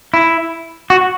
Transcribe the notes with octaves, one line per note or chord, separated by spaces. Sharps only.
E4
F#4